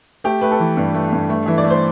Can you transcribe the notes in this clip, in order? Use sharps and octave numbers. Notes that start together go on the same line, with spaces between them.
A3 G4
A3 B4
A4
E3
G2
A3
G2
A3
E3 E5
D5
A3
C5